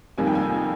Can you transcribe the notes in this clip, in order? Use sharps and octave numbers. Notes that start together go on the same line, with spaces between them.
F2 C3 D#3 G3 A#3 G#5
G5
G#5